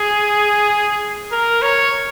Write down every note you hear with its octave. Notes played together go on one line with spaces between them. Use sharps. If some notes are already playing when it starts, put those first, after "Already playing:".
Already playing: G#4
A#4
C#5